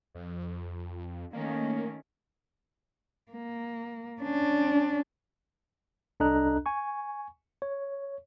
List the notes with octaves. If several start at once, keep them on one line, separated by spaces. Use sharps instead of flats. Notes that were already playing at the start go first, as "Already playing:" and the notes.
F2
D#3 A3 A#3 C#4
A#3
C#4 D4
C2 D4 A4 D#5 A#5 F#6
G#5 C#6
C#5